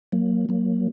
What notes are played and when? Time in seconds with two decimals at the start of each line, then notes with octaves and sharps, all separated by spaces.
0.12 F#3 A#3
0.49 F#3 A#3